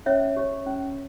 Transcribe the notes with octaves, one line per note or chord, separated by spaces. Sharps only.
C#4 C#5 E5
G4 C#5
C#4